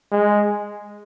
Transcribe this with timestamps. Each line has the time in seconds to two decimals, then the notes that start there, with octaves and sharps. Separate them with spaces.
0.12 G#3